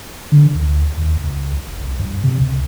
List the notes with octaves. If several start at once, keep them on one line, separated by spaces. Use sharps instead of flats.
D3
D2
D#2
C#2
F1
C2
G2
C3
C#2